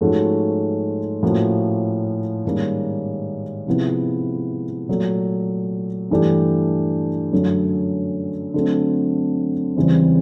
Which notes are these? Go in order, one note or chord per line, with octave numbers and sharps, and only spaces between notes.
G#2 F3 A3 C#4 F#4
A2 F3 A#3 C#4 F#4
G#2 D#3 G3 A#3 C#4
C3 F3 G#3 B3 E4
A#2 F#3 A3
G2 E3 A3 D4 G4
F#2 D3 F#3 A3 C#4
D3 F#3 A3 C4
E2 C#3 E3 G3 C4